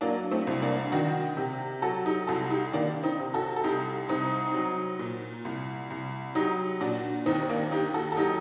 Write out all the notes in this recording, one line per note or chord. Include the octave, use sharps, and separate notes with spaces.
F#3 A#3 D4
A3 C4
C2
A#3 D4
D#3 D4 F#4
C3
F#3 F#4 A4
D#4 G4
C2 F#4 A4
D#4 G4
D#3 A#3 D4
C4 D#4
C3
F#4 A4
A4
C2 D#4 G4
C2 C4 D#4
F#3
A#2
C2
C2
F#3 D#4 G4
A#2 D4 F#4
D#2 C4 D#4
A#3 D4
D#2 D#4 G4
F#4 A4
A4
F#3 D#4 G4